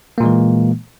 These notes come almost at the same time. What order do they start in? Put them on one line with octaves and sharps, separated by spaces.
A#3 A#2 G#3 E3